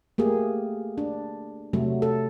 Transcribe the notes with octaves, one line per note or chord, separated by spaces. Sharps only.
A3 A#3 G4 G#4
D4
C3 F#3 A3
A4